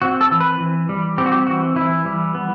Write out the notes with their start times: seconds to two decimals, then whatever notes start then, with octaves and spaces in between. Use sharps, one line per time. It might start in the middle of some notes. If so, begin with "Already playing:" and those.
0.02 C4 F#4
0.21 A4
0.31 E3
0.40 B4
0.60 E3
0.89 G3
1.18 C4 G4
1.26 F#4
1.32 G4
1.47 E3 F#4
1.76 E3 E4
2.05 G3
2.35 B3